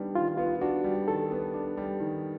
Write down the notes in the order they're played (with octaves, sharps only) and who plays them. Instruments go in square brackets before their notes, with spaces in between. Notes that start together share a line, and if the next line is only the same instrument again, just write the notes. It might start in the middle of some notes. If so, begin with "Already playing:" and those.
Already playing: [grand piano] D#3 G3 B3 D4
[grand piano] D#3 [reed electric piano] F4
[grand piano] B3 [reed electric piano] F4
[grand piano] D4 [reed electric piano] F#4
[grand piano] G3
[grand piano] D#3 [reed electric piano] A4
[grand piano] B3
D4
G3
D#3